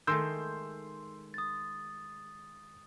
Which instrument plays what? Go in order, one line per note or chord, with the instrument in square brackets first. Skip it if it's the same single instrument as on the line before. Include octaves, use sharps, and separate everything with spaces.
[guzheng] D#3 G#3 A3 [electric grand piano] C6 E6 G6
[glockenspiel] D#6 A6